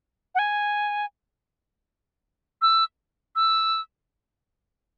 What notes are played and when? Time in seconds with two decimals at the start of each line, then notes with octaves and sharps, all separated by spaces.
0.35 F#5
0.39 G#5
2.62 E6
3.36 E6